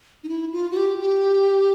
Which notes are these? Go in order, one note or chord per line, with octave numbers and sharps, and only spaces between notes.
D#4
E4
F4
F#4
G4
G4